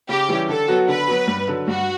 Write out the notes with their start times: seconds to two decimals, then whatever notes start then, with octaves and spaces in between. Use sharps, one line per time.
0.09 C#3 G4
0.29 E3 G3 C#4 E4
0.48 D3 A4
0.68 F#3 B3 F#4
0.88 D3 B4
1.08 F#3 B3 F#4
1.27 G2
1.48 D3 F#3
1.67 G2 F#4